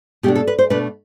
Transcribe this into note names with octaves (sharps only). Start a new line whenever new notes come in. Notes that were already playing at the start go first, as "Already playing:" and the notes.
B2 A3 D4 G4
A4
B4
C5
B2 A3 D4 B4